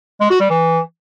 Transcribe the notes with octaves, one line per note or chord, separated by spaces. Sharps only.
G#3
F#4
G3
E3